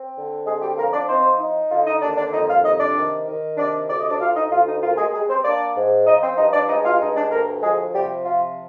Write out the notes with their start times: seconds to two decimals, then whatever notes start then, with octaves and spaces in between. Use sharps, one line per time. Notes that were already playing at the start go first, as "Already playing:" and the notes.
Already playing: C4
0.15 D3
0.46 G#3 C4 G#4
0.61 G3 G4
0.77 F3 A#3 A#4
0.93 D4 D5
1.08 C4 D#4 C5
1.40 D#4
1.70 D3 F4
1.86 D#4 D#5
2.02 D#2 D4 D5
2.17 D4 D5
2.33 F2 D#4 D#5
2.49 F4 F5
2.64 C3 D#4 D#5
2.80 D4 D5
2.96 D#3
3.26 D#3
3.57 C3 D4 D5
3.89 D2 D5
4.00 D#5
4.10 D4 D5
4.20 D2 F4 F5
4.35 D#4 D#5
4.51 D2 F4
4.66 D#4
4.82 A#3 F4
4.98 G#3 G#4
5.13 G3 G#3 G#4
5.29 C4 C5
5.44 A#3 D4 D5
5.77 G#2
6.07 F3 D#4 D#5
6.23 C4 C5
6.38 G2 D#4 D#5
6.53 D4 D5
6.69 G#3 D#4 D#5
6.85 F4 F5
7.00 G2 D#4 D#5
7.16 D4 D5
7.31 D2 A#3 A#4
7.63 F3 G#3 G#4
7.94 C3 G3 G4
8.25 F3 F4